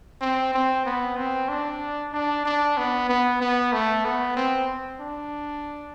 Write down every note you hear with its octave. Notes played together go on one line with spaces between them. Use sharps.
C4
C4
B3
C4
D4
D4
D4
B3
B3
B3
A3
B3
C4
D4